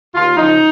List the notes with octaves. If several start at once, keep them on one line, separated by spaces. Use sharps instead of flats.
D#2 F4
C#3 F3 D#4